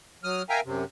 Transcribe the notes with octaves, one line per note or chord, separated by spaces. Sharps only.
F#3 D#6 F6
A#4 E5 F5 G5 G#5 A#5
F#2 C3